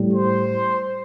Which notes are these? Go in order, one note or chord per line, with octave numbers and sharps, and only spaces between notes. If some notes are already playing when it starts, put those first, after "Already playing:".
Already playing: A2 G3
C5